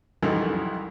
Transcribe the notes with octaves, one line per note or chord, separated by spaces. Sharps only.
C2 F2 D#3 E3 F#3